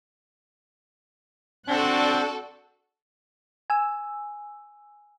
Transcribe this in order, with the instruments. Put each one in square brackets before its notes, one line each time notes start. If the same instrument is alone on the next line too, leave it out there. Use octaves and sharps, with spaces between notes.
[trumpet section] C4 [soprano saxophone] D4 [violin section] F#4 A4 D5 [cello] F#5
[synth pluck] G#5 E6